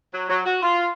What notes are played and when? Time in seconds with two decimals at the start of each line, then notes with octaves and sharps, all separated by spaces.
0.14 F#3
0.29 F#3
0.46 F#4
0.62 F4